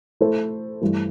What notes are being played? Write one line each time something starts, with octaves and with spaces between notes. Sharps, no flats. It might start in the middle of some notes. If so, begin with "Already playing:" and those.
A3 E4 A4 C5
G2 E3 A3